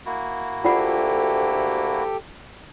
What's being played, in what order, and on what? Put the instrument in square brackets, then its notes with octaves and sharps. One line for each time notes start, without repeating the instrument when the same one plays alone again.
[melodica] A#3 E4 F#4
[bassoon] D2 [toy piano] F4 D5 F#5 [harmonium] G4 A4 G5